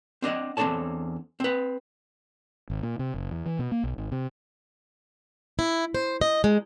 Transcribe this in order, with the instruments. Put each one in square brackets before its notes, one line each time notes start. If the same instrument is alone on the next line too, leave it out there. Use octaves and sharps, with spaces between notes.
[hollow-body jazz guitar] C4 D4 D#5 F#5
E2 C4 D4 A4 C#5 A5
C4 B4
[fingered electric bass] G#1
A#2
C3
F#1
E2
E3
B2
A#3
B1
G#1
C3
[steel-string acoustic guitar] E4
C5
D#5
G#3